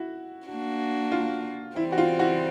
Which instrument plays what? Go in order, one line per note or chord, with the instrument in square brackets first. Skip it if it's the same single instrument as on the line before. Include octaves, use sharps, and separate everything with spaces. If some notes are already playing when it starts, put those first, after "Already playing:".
Already playing: [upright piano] E4 F#4
[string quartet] A#3 D4 F#4
[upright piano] F4
[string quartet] E3 G3 C4 [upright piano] E4
[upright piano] F#4
F4
E4 F#4